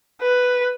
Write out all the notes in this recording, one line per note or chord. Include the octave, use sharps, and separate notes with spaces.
B4